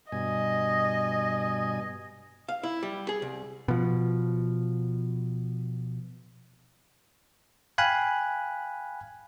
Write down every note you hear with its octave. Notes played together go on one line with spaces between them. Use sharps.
G2 B2 D#5 G#5
F5
E4
G3
G#4
C2
B2 F3
F5 G5 G#5 B5 F#6